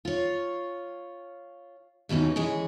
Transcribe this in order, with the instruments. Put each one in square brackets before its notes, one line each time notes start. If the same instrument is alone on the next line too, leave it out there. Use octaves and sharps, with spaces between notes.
[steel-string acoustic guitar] F4 C#5
D#2 B2 E3 C#4 D#4
E3 G#3 C#4 G#4